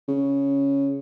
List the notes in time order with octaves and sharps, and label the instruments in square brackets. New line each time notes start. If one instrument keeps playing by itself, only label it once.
[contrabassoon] C#3